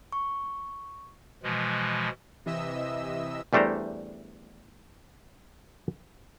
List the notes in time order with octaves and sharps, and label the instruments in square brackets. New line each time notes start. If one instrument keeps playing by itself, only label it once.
[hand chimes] C#6
[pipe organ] B2 E3 F3 G#3
[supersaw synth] C3 E3 D#5 E5 E6
[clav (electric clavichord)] E2 G3 A3 D4 C5 A#5